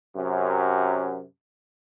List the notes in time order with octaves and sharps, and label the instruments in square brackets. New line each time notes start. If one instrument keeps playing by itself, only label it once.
[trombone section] F#2 C3